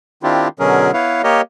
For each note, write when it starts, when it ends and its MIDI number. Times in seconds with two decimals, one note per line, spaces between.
0.23 0.48 51
0.23 0.48 60
0.23 0.48 62
0.23 0.48 64
0.23 0.48 65
0.23 0.48 67
0.59 0.91 47
0.59 0.91 50
0.59 0.91 54
0.59 0.91 61
0.59 0.91 68
0.59 0.91 70
0.93 1.22 59
0.93 1.22 64
0.93 1.22 71
0.93 1.22 73
0.93 1.22 77
1.24 1.41 58
1.24 1.41 67
1.24 1.41 70
1.24 1.41 73
1.24 1.41 75